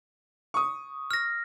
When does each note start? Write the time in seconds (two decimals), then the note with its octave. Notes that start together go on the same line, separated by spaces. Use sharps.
0.54 C#6 D#6
1.11 F6 A#6